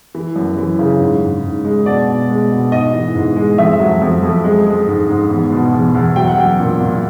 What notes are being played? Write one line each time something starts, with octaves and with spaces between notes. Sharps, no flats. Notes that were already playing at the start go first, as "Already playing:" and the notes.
E3
F#2
E3
C#3
G#2
G#2
G#2
G#3
B2 D5
B2
G#3
B2
G#2 D#5
E3
G#2
G#3
F2 E5
F#3
F2
F2
G#3
G#3
G#2
G#2
E2
B2
E2
E2
F#3 G5
F#5
F#3 G5
A#2
A#2